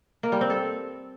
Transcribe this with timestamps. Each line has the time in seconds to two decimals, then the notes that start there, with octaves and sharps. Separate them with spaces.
0.23 A#3
0.32 G3
0.41 C4
0.50 A4